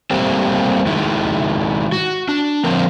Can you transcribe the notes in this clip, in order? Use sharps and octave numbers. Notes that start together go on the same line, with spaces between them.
G3 A3 A#3 C4 G4
D#3 G#3 E4
F#4
D4
D3 F3 A#3 C4 A#4